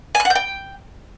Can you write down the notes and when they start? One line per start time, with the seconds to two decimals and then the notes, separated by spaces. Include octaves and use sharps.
0.15 G#5
0.20 F#6
0.25 F#5
0.30 G6
0.35 G5